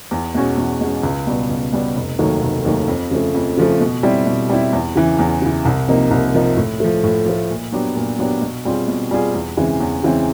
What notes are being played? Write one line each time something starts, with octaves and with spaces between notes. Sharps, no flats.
E2
B2 G#3 C#4 F#4
E2
B2 G#3 C#4 F#4
C#2
B2 G3 B3
C#2
B2 G3 B3
F1
D#2 D#3 F#3 A3
F1
D#2 D#3 F#3 A3
F2
C#3 F3 A3
F2
C#3 F3 A3
B2
G3 C4 E4
B2
G3 C4 E4
E2
C#3 E3
E2
C#3 E3
C2
C3 F3 A#3 D#4
C2
C3 F3 A#3 D#4
A2
F3 A3
A2
F3 A3
A#2
F#3 B3 D4 G4
A#2
F#3 B3 D4 G4
B2
G3 C4 F4 G#4
B2
G3 C4 F4 G#4
E2
C#3 E3 G#3 C4
E2
C#3 E3 G#3 C4